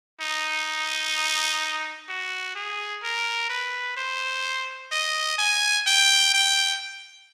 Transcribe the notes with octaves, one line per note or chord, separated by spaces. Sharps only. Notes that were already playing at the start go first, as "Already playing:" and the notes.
D#4
F#4
G#4
A#4
B4
C5
D#5
G#5
G5
G5